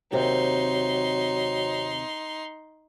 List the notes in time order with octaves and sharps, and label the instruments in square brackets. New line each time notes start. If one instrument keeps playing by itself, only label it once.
[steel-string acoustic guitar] D#2 C3 C4 [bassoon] F#3 [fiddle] D#4 C6